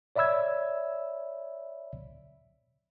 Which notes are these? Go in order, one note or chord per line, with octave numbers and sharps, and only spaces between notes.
C#5 D5 E5 B5 E6 G#6